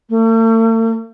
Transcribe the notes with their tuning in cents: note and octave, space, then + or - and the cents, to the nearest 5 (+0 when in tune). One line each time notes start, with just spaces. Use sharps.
A3 +45